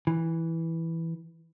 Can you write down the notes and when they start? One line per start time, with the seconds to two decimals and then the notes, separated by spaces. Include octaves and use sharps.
0.07 E3